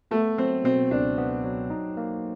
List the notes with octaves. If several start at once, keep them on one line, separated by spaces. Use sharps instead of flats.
A3 B3
F#3 C4
B2 C4
C#2 D4
B3
F#3
D#4
A#3